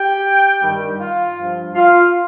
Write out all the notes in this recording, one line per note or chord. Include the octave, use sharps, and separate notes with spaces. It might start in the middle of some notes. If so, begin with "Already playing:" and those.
Already playing: G4 G5
G2 D#3 G3
F4 F5
G2 F3
F4 F5